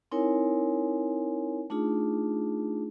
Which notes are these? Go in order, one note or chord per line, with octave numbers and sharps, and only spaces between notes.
C4 D#4 E4 A#4 C#5 G#5
A3 D4 D#4 F4 G#4